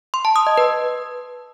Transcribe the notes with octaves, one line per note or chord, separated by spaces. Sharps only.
C6
A5
D#6
D#5
B4